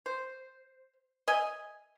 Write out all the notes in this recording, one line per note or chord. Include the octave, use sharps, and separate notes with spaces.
C5
D#5 E5 G#5